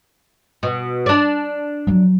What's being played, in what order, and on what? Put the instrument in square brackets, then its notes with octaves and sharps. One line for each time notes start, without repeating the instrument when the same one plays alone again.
[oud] B2
D4 D5
[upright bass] F3 F#3